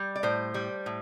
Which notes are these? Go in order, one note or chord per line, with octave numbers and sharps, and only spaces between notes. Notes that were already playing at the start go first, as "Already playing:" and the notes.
Already playing: G3
D5
A2 C5
G3
A2